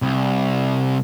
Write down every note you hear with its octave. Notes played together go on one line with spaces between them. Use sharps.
C2